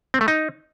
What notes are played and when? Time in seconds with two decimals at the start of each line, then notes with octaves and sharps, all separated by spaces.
0.14 C4
0.21 A3
0.28 D#4